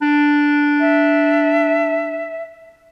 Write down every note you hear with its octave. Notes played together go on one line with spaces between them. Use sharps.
D4
E5